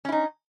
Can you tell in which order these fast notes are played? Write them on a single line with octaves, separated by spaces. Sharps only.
C#4 E4 D#4